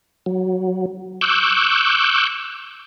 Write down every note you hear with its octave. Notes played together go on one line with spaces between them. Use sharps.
F#3
C#6 D6 E6 F#6 G6